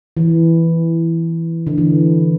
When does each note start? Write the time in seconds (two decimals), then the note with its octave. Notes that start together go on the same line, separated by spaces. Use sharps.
0.17 E3
1.67 D3
1.78 E3